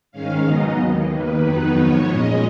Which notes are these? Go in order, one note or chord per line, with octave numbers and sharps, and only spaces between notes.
G#2 D#3 G#3 C#4 F5
C#3 F#3 B3 D#4 D#5
D#2 D#3 A#3
D#2 D#3 A#3 B4
F2 D#3 F#3 B3 D#4 B4
G#2 F3 B3 C#5
A#2 G#3 C#4 D#5